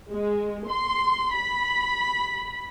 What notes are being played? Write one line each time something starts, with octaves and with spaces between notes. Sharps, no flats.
G#3
C6
B5